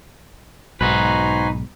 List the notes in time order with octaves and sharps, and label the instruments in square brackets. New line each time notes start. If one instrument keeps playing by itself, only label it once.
[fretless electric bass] B1 G#2 [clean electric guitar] D#4 B4 [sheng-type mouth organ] F#4 C5 G#5